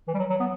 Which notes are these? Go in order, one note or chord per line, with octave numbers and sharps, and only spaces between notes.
E3
G3
F#3
F#3
B3